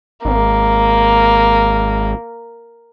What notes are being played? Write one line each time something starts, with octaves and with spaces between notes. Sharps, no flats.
G#1 A#3